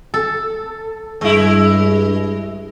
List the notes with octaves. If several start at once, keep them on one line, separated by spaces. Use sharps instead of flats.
A4
G2 G#3 E4